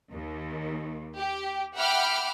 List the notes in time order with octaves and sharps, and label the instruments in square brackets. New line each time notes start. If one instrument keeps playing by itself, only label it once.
[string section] D#2
G4
E5 F#5 G5 B5 D6 F6